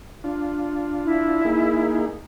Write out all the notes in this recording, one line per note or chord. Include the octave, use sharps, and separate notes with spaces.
D4 F4
E4
A#3 D#4 G#4